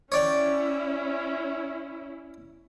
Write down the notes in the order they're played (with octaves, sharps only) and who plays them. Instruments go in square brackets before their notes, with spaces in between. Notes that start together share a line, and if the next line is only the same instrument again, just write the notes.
[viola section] C#4 E4 [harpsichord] C#5 D5 G5